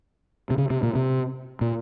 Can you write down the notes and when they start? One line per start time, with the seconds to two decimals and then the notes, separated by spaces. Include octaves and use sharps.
0.50 C3
0.58 C#3
0.70 C3
0.83 A#2
0.95 C3
1.61 A#2